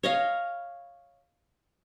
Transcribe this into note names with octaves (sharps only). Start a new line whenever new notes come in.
C#5 D#5 F5